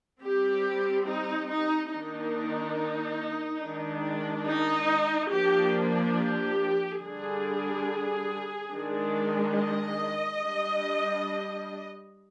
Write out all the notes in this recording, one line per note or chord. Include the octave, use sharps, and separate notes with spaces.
G3 C4 G4
D#4
D#4
D#3 A#3 D4 D#4
D#3 G#3 D4
D#4
F3 A#3 D4 G4
G4
D3 G3 D4 G#4
D#3 G#3 D4
D#5
G3 D4